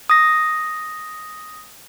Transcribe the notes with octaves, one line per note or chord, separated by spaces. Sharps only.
D#6 A#6